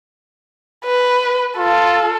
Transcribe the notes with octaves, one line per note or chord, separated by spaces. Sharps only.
B4
F4 A4